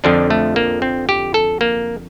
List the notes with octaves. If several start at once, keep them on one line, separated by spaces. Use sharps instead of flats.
F2 D3 F3 D4
A3
A#3
C4
G4
A4
A#3